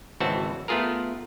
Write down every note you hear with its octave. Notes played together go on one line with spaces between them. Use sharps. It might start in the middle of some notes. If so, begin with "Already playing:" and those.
G#1 C#2 E3 C4 F#4 A5
A3 B3 F4 G#4 A#4